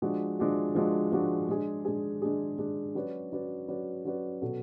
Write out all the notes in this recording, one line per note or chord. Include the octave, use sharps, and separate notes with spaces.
F3 G#3 D4 F#4
F3 G#3 D4 F#4
F3 G#3 D4 F#4
F3 G#3 D4 F#4
G#3 D4 G#4
G#3 D4 G#4
G#3 D4 G#4
G#3 D4 G#4
F#3 C#4 F#4 B4 D5
F#3 C#4 F#4 B4 D5
F#3 C#4 F#4 B4 D5
F#3 C#4 F#4 B4 D5
B2 F#3 B3 F#4 A4